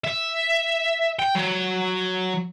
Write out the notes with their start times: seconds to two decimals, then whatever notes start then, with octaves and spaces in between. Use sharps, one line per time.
0.04 E5
1.19 G5
1.35 F#3